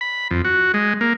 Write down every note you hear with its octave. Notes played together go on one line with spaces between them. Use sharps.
B5
F2
F#4
G#3
A#3